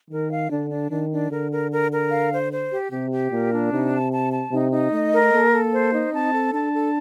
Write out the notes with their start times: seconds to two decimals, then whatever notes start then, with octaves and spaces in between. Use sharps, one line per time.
0.10 D#3 A#4
0.30 F5
0.50 D3 D4
0.70 D4
0.91 D#3 D4
1.11 D4
1.30 D3 A#4
1.50 A#4
1.71 A#4
1.91 A#4
2.11 F5
2.31 C5
2.51 C5
2.72 G4
2.92 C3 G4
3.11 G4
3.31 A#2 A#4
3.52 D4
3.72 C3 D#4
3.92 A5
4.12 A5
4.32 A5
4.52 C3 D#4
4.72 D#4
4.92 A3 D#5
5.12 A#4
5.32 A#3 A4
5.53 A4
5.72 C5
5.93 D#4
6.13 C4 A5
6.33 A4
6.53 D4 A5
6.73 A4